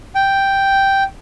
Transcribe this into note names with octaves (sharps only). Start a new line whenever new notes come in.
G5